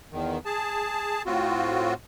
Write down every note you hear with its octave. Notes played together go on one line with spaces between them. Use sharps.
E2 D#3
G#4 A5
A2 C4 F4 F#4